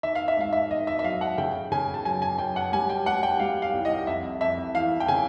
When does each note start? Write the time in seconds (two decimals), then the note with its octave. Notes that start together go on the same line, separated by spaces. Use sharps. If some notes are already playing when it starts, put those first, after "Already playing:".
0.03 D#3 E5
0.15 F5
0.28 E5
0.37 G#2 F5
0.53 E5
0.71 D#3 D#5
0.87 E5
0.99 E5
1.04 F#3 F5
1.21 F#5
1.38 C#3 G5
1.72 C#3 G#5
1.94 A5
2.05 F#2 G#5
2.22 G#5
2.38 F#2 G5
2.56 F#5
2.73 G3 G#5
2.90 G5
3.06 G3 F#5
3.23 G5
3.40 G3 F5
3.62 F5
3.73 C2
3.85 D#5
4.07 F2 E5
4.41 F2 E5
4.75 E3 F5
5.00 G5
5.08 C#3 G#5